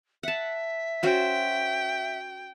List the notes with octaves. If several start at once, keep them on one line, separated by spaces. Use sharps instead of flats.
E5 F#5 A5
C#4 F#4 C5 G5